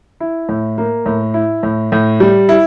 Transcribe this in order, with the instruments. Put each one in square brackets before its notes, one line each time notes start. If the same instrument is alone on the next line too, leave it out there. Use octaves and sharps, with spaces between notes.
[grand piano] E4
A2
A#3
A2
E4
A2
A2
G3
E4